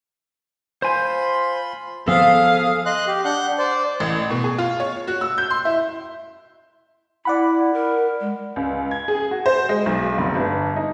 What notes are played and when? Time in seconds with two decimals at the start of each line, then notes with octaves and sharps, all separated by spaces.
0.82 F4 C5 G#5 B5 C6
2.08 F3 B3 G#4 A4 F5 D#6
2.86 D#5 C6 F#6
3.07 G4
3.25 D4 F#5 F#6 G6
3.58 C5 D5
4.00 A1
4.30 B2
4.44 G#4
4.58 F4
4.80 C#5
5.07 F#4
5.21 E6
5.38 G6
5.50 C6
5.65 E4
7.25 E4 D5 F#5 B5
7.73 A#4
8.20 G#3
8.56 C#2
8.91 G#6
9.08 G#4
9.31 F#4
9.46 C5
9.69 G#3
9.86 B1
10.18 F1
10.35 G1
10.76 D#4